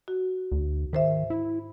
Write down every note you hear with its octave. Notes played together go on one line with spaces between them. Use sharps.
F#4
D2
G#2 D#3 C5 E5
E4